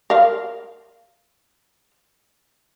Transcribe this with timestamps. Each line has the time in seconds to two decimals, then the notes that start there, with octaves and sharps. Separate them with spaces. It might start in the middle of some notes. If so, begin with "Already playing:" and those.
0.10 A#4 F5